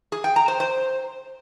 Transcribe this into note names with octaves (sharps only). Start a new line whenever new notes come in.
G#4
G5
A#5
C5
C5